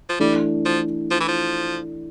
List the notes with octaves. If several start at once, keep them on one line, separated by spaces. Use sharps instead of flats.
F3
E3 G3 A3 D4
F3
F3
E3
F3